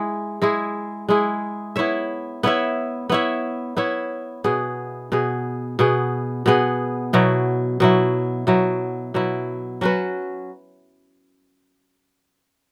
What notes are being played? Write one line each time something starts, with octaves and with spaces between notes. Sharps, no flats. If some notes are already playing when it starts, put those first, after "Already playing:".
Already playing: G#3 E4 G#4
G#3 E4 G#4
G#3 E4 G#4
B3 E4 C#5 E5
B3 E4 C#5 E5
B3 E4 C#5 E5
B3 E4 C#5 E5
B2 B3 G#4
B2 B3 G#4
B2 B3 G#4
B2 B3 G#4
B2 F#3 E4
B2 F#3 E4
B2 F#3 E4
B2 F#3 E4
F#3 C#4 F#4 B4